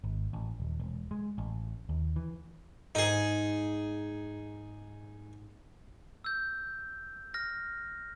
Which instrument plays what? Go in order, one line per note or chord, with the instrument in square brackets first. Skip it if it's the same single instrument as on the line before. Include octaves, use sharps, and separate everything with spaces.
[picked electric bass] G#1
A1
D#1
E1
G#3
A1
D#2
E3
[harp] G#2 [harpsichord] D#4 G#4
[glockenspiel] E6 G6
F6 A#6